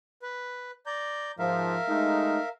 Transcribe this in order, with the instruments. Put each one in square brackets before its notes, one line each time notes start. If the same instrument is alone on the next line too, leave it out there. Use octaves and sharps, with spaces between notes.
[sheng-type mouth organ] B4
D5 A#5 G6
[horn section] G#2 F3 [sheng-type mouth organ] A#4 E5 F5
[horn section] G#3 A3 D#4